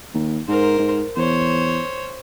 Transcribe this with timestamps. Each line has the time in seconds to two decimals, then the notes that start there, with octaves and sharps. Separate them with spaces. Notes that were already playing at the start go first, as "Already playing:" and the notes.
0.14 D#2
0.48 G#2 A#4 C5
0.79 G#2
1.16 E2 C5 C#5